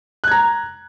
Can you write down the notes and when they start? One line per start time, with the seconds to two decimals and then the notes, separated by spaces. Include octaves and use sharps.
0.24 F#6
0.28 G#6
0.31 A#5